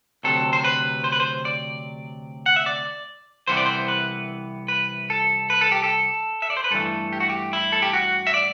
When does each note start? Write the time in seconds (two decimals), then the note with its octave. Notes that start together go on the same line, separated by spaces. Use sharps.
0.23 D2 C3 F#3 A4
0.53 C5
0.64 B4
1.04 C5
1.12 B4
1.20 C5
1.45 D5
2.46 F#5
2.56 E5
2.66 D5
3.47 C2 C3 E3 B3 C5
3.57 D5
3.66 C5
3.88 B4
4.68 B4
5.10 A4
5.50 B4
5.61 A4
5.72 G4
5.84 A4
6.42 E5
6.50 D5
6.57 C5
6.64 B4
6.71 G2 E3 A3 A4
7.13 G4
7.20 F#4
7.30 G4
7.53 E4
7.72 A4
7.82 G4
7.93 F#4
8.27 E5
8.34 D5